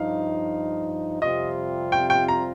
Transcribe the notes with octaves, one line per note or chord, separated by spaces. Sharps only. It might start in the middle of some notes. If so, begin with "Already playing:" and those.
Already playing: G2 F3 D#4 F5
F2 C3 G3 C4 F4 D#5
G5
G5
A#5